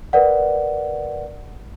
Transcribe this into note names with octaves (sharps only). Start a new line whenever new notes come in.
A#4 B4 D5 F#5